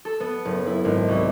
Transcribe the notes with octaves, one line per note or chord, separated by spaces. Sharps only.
A4
B3
F#1
E4
G#1
C2